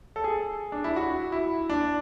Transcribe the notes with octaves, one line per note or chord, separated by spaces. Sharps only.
A4
G#4
D4
E4
F#4
E4
D4